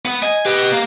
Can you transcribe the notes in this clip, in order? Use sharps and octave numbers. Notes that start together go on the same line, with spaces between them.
B3
D#5 G#5
G4 B4 D#5
A#3